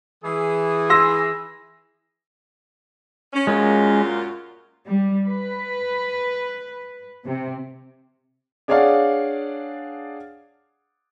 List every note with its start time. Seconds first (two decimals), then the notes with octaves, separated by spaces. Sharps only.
0.24 E3 G#4
0.90 C6 E6 A#6
3.33 C#4
3.47 F#2 A#2 G#3 C#4 F4
4.87 G3
5.28 B4
7.23 C3
8.68 D4 G#4 C#5 D5 F5 F#5